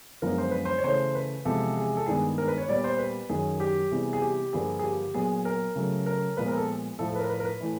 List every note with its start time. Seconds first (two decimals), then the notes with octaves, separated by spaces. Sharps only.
0.22 F#2 D3 F3 G#3 B3 A#4
0.38 C5
0.51 B4
0.65 C5
0.78 C#5
0.84 C#3 E3 A3 C5
1.15 B4
1.45 E2 C3 F3 G#3 A4
1.77 G#4
1.97 A4
2.06 G2 D#3 G#3 B3 G#4
2.38 A#4
2.48 B4
2.58 C#5
2.68 A#2 G3 B3 D5
2.84 C5
2.98 B4
3.29 F#2 D#3 F#3 G#4
3.60 G4
3.91 C3 E3 G3 B3 G#4
4.13 G#4
4.22 G4
4.53 G2 D3 F3 A#3 G#4
4.79 G#4
4.84 G4
5.14 A#2 F#3 B3 G#4
5.45 A#4
5.76 C#3 F#3 A3
6.06 A#4
6.37 A#2 F3 G#3 B3 B4
6.48 A#4
6.57 A4
6.99 A2 F3 A3 A4
7.09 A4
7.15 B4
7.20 A#4
7.29 B4
7.40 A#4
7.45 B4
7.60 A2 E3 A3